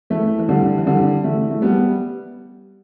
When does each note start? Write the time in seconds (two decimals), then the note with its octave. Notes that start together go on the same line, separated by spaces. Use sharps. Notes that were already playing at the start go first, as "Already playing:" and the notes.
0.10 E3 A3
0.39 E3
0.49 D3 G3
0.77 E3
0.86 D3 G3
1.24 E3 A3
1.51 A3
1.62 G3 B3